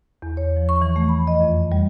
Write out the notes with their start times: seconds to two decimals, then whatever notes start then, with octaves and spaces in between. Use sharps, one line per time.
0.22 E2
0.37 C#5
0.56 F3
0.69 C#6
0.82 E3
0.96 A3
1.09 B5
1.27 D#5
1.41 F2
1.55 F2
1.72 G3